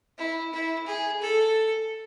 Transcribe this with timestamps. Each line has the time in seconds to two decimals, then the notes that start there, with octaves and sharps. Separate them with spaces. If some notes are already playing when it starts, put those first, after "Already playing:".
0.18 E4
0.53 E4
0.87 G#4
1.21 A4